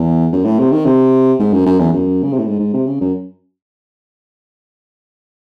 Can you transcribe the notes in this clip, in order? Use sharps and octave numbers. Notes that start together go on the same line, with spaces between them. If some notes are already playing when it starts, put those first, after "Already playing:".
Already playing: E2
F#2
A2
C3
D#3
C3
G#2
F#2
F#2
E2
F#2
C#3
C3
A2
G#2
G#2
C3
C#3
F#2